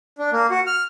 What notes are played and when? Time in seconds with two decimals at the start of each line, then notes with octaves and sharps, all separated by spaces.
0.18 D4
0.32 A#3
0.51 F#4
0.67 F6